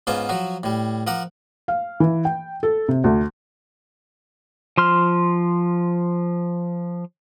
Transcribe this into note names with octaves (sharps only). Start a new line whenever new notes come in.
G#2 B3 C#4 F4 C5 D6
F3 F#3 F#4
A2 G3
F3 A#4 F#5 D6
F5
E3
G5
A4
C3
D2
F3 C6 F6